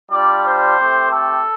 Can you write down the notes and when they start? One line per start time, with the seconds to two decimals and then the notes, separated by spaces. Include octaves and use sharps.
0.11 G3 D4 F4 D5
0.44 C5
0.77 A3 C4 G4
1.10 A4